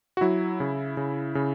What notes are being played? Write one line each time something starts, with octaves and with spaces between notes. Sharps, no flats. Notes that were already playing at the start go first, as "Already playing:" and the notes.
F#4
F#3 E4
C#3
C#3
C#3